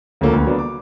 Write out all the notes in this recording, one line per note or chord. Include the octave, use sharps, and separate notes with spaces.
D2 C#3 F3 A#3 A4
D2 B3
F#3 A#3 B3 D4
D6